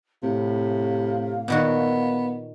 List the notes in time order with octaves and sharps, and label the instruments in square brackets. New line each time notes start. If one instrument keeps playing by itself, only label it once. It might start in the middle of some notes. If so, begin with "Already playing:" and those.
[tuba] A2 [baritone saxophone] C3 [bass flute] F5
[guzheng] A#2 D#3 F#4 [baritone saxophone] B3